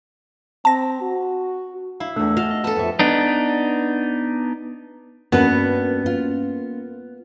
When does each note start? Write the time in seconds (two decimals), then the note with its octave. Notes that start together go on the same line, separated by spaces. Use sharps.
0.65 C4 A5 A#6
1.01 F#4
2.00 E4 F5
2.16 E2 A3 D4 E6
2.37 F#4 D#5 F5 A5
2.51 D#5
2.64 B3 A4 A5
2.77 F2 E5
2.99 B3 D4 D#4
5.32 G2 A#3 B3 C#4 F#4 A#4 B4
6.06 F4